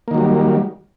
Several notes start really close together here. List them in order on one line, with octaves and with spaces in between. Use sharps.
A#3 D#3 F#3 G3